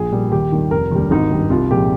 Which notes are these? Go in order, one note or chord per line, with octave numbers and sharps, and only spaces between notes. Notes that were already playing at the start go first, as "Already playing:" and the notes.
Already playing: A#1 G#4
A#2 G3
D#2 G4
D#3 G3
F1 A#4
D#2 D3 G3
G#1 D#4
G2 D#3 G3
C2 F4
A#2 F3 G#3 G4